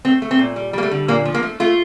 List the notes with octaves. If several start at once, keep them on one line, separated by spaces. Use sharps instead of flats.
A3 C4
A3
C4
A#2
G3
G3 A#3
A3
D3
A#2 A#3
F3
A#3
A3
A3 F4